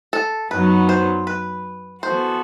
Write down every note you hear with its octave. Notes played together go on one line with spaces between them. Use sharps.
A4
F#2 F#3 B3 D#4 B4
C5
B4
E3 B3 F#4 A4 C5